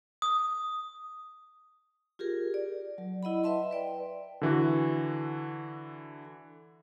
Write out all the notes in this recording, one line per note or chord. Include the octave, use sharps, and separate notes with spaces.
D#6
F4 G4 G#4 A#4
D5
F#3
E4 D#5 F#5 B5
B4 D#5 E5 A5 C6
B4 D5 G5
D3 E3 F#4